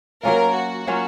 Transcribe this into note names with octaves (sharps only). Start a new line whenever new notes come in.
F#3 A#3 C#4 F4 A#4
F#4
F#3 A#3 C#4 F4